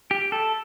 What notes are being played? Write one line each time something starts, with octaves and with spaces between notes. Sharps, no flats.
G4
A4